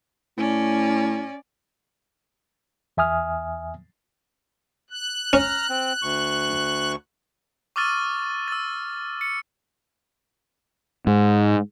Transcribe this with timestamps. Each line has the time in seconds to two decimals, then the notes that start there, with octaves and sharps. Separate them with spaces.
0.37 A2 C#4 D5
2.97 E2 E5 G#5 D#6 F6
4.90 F#6
5.33 C#4 A#5 F6
5.70 C4
6.02 D2 C#6
7.76 C#6 D6 E6 F6 A6 D#7
8.48 E6 A6
9.21 C#7
11.07 G#2